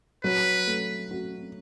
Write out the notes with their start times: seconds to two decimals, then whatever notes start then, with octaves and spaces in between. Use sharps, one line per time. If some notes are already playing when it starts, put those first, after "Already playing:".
0.24 F#3 B4
0.67 A3
1.11 F#4